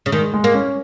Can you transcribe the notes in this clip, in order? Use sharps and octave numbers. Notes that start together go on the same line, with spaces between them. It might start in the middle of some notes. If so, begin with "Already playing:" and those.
C#3
D#3 G#3
G#3
A#3
C#4